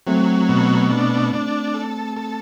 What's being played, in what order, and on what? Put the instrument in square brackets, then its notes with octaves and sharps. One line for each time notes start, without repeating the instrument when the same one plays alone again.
[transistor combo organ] F#3 [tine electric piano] A3 C4
[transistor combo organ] B2
D4
D4
A4
A4